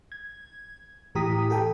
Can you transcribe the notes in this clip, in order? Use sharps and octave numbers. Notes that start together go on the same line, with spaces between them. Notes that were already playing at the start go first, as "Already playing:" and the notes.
G#6
A2 E3 G4 A#5 D#6 B6
G4 A4 G5